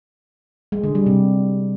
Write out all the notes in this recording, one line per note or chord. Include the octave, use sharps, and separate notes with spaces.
G#3
D3
G3
C3